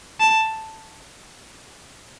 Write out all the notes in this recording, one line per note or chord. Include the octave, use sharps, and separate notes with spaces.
A5